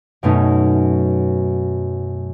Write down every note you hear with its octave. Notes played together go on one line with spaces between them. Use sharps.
F#2 B2 A3 C#4 D#4